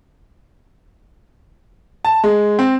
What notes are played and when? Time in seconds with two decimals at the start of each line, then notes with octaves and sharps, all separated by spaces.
2.05 A5
2.24 G#3
2.59 C4